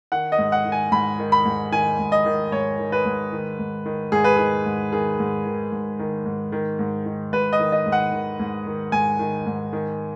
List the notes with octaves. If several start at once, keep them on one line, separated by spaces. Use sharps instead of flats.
D#3 F#5
D#5
G#2
F#5
D#3
G#5
G#2 B5
D#3
B5
G#2
D#3 G#5
G#2
D#5
D#3
G#2 C#5
D#3
B4
G#2
D#3
G#2
D#3
G#2 G#4
B4
D#3 G#4
G#2
D#3 G#4
G#2
D#3
G#2
D#3
G#2
D#3
G#2
D#3
G#2 B4
D#5
D#3
D#5
G#2
F#5
D#3
G#2
D#3
G#2 G#5
D#3
G#2
D#3